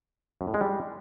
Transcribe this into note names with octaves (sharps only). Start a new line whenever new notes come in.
F#2
A2
G#3
G3